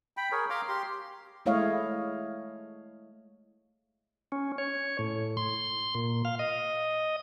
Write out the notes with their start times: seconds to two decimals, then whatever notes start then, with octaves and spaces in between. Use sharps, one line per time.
0.17 G5 B5
0.32 G#4 A#4 C#5
0.50 F5 A#5 C6 D6
0.68 G4 C6
1.46 G#3 A3 E4 C#5 D#5 F5
4.32 C#4
4.58 C#5
4.99 A2
5.37 C6
5.95 A#2
6.25 F5
6.39 D#5